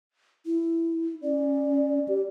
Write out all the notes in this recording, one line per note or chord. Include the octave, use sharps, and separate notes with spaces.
E4
C#4 D5
G4